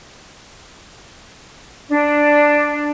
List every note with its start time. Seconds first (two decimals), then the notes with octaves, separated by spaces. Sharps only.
1.89 D4